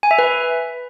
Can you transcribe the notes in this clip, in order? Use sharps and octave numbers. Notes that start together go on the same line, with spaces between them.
G#5
E5
B4